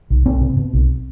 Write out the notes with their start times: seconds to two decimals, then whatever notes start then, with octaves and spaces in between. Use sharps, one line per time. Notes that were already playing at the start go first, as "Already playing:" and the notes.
0.10 B1
0.26 B1 C4
0.41 B2
0.56 B2
0.73 B1